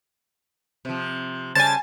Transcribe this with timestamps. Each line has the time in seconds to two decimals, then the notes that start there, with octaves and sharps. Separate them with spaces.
0.85 C3 F3
1.55 C#3 G3 C5 G#5 A5 A6